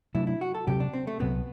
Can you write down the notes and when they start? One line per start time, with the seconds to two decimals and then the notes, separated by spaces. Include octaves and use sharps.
0.14 C3 F#3 A3 D4 E4
0.27 E4
0.41 F#4
0.55 A4
0.67 D2 C3 F#3 C4 G4
0.80 D4
0.93 C4
1.07 A3
1.20 C2 C3 F#3 B3 C4